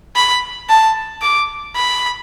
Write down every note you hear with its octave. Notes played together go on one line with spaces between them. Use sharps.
B5
A5
D6
B5